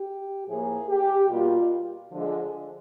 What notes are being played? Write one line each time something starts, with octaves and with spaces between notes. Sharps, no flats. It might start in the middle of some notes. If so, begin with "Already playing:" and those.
Already playing: G4
A2 F3 A#3 G#4
G4
B2 G3 A#3 F4
D3 F3 G#3